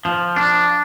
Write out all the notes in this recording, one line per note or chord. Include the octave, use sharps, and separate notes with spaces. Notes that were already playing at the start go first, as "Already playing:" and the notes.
F3
D4